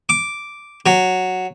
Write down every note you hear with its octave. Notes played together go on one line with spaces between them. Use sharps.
D6
F#3